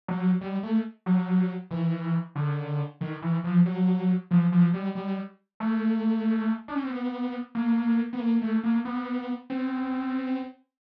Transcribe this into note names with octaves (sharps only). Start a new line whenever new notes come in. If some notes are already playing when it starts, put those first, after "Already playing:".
F#3
G3
A3
F#3
E3
D3
D#3
E3
F3
F#3
F3
F3
G3
G3
A3
D4
C#4
C4
B3
A#3
B3
A#3
A3
A#3
B3
C4